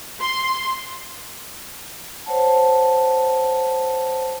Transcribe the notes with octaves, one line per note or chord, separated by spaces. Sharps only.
C6
C5 C#5 F#5 A5